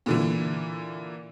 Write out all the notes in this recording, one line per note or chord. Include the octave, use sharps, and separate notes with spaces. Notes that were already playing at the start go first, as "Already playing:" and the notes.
A#2 D3 E3